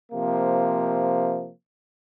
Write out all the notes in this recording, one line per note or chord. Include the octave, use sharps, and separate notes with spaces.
C3 F3 A#3